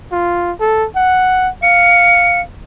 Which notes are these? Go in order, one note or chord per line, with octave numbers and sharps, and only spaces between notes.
F4
A4
F#5
F5 C#7